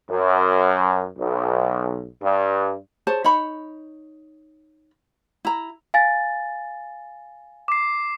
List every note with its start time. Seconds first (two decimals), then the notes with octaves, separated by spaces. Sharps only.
0.10 F#2
1.19 B1
2.23 G2
3.07 G#4 C5 C#5 A5
3.24 D#4 C#5 B5
5.45 E4 A#5
5.94 F5 G#5 A6
7.68 D6 C7